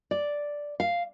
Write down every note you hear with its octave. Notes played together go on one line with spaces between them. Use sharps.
D5
F5